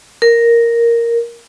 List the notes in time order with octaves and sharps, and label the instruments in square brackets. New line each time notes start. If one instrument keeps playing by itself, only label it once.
[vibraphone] A#4